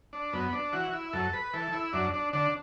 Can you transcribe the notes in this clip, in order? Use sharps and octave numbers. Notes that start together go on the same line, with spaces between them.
D4
F#2 B3
D4
E3 F#4
E4
F#2 A4
B4
E3 A4
E4
F#2 D4
D4
D3 D4